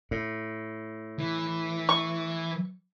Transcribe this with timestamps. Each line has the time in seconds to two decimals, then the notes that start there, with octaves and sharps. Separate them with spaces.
0.11 A2
1.19 E3
1.89 C#6